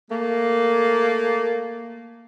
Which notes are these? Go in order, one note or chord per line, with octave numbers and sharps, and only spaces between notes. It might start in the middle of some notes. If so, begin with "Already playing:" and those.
A3 A#3